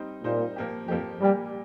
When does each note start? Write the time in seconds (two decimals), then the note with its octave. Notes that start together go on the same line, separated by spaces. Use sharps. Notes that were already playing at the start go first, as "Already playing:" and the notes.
Already playing: G3 C4 D#4 C5
0.24 A#2 G3 C4 D#4 C5
0.56 F3 A#3 G4
0.88 F2 F3 A#3 G4
1.20 A#2 G3 A#3 G4